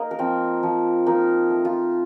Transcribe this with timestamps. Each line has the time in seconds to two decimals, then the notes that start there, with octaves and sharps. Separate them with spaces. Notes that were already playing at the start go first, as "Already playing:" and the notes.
Already playing: A#3 D#4 D#5
0.11 A#4
0.18 F3 C4 C5
0.63 F3
1.06 A#3 D#4 A#4
1.50 A3
1.65 F4